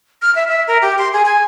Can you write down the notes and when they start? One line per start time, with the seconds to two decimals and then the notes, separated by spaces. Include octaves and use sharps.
0.22 F6
0.35 E5
0.48 E5
0.68 A#4
0.82 G4
0.99 C6
1.13 G#4
1.25 G#5